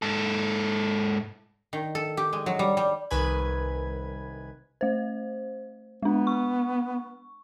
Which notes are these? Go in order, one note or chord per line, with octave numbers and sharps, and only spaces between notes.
G#2 A4
D#3
A4
G4
G#3
F#3
G3
G3
C2 D#3 B4 G#5 B5 G#6
A3 C5
G#3 B3 D4
C#6